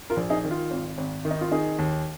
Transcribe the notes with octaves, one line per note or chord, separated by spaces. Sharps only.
F4 A#4
A#1
D#4 G#4
D#3
F4
G#1
G#1
D#3
D#4
F4
D#3 D#4 G#4
D#2